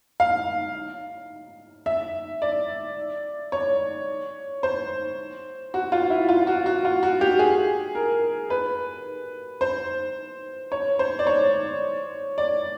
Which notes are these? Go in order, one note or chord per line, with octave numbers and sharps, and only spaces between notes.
F5
E5
D5
C#5
C5
F#4
F4
E4
F4
F#4
F#4
F4
F#4
G4
G#4
A#4
B4
C5
C#5
C5
D5
C#5
D5